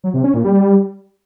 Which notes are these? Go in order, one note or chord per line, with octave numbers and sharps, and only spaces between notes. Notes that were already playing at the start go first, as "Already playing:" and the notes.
F#3
C3
C#4
A#2
G3